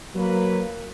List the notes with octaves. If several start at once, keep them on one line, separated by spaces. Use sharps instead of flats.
F#3 A#3 B4